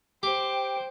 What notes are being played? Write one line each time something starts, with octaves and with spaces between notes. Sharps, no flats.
G4 C5 G5